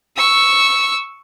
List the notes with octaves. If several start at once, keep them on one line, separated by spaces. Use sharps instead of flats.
C#6 E6